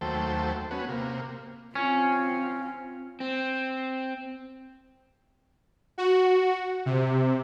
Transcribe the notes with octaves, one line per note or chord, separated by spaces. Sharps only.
D#2 F#3 A3 C5 G5 A5
B3 C#4 F#4
C3 A#3
C4 C#4 F4
C4
F#4
C3